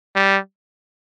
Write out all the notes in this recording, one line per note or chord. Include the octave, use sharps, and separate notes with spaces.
G3